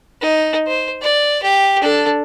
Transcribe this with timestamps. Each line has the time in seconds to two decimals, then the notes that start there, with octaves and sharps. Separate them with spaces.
0.21 D#4
0.67 C5
1.01 D5
1.43 G4
1.82 D4 A4